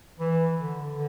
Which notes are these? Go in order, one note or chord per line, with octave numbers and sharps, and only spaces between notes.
E3
D3
D3